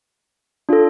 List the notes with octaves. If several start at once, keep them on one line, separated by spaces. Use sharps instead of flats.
D4 F4 A4